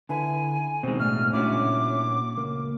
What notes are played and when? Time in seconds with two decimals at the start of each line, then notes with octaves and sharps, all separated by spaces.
0.09 D3 E4 B4 G#5
0.83 B2 D#3 G#3 C4
1.00 A2 D4 F6
1.33 A#2 C#4 D4 E4 F#4 D6
2.37 C#2 A#3